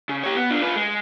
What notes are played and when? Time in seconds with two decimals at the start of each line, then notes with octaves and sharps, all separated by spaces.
0.09 C#3
0.24 G4 C#5
0.36 B3
0.50 D4 F4
0.62 F4 B4
0.76 G#3